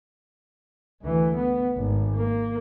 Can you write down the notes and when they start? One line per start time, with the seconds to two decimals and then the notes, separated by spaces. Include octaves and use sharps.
1.02 D2 E3
1.36 B3
1.76 G#1
2.15 A#3